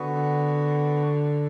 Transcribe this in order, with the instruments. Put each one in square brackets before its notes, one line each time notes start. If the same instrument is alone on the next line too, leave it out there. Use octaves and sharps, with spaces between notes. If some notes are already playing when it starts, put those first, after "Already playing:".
Already playing: [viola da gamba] D3 [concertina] B3 F#4 B4